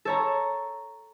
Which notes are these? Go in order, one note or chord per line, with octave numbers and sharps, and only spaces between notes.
A4 C#5 A#5